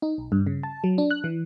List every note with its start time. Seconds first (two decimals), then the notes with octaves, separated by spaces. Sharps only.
0.02 D#4
0.18 B1
0.32 G2
0.46 C#3
0.63 A5
0.84 F#3
0.98 D4
1.11 F#6
1.24 E3